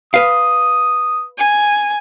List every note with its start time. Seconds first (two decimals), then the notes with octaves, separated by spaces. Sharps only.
0.14 B4 F5 D#6
1.37 G#5